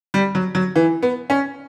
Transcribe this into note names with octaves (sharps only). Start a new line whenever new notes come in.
G3
F#3
F#3
E3
B3
C#4